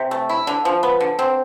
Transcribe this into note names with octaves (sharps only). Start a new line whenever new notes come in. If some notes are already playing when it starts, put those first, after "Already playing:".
Already playing: C3
A3
E4
D3
F3
B3
D3
C4